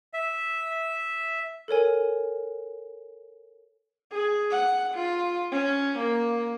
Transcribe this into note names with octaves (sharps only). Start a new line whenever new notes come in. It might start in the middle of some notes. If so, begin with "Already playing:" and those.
E5
A4 A#4 C#5 G#5
G#4
F#5
F4
C#4
A#3